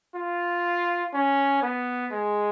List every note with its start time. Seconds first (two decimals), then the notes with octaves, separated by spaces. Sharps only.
0.15 F4
1.14 C#4
1.63 B3
2.12 G#3